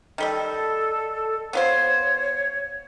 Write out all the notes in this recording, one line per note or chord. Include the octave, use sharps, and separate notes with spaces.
D#3 G3 A4 D#5
B3 F4 C5 C#5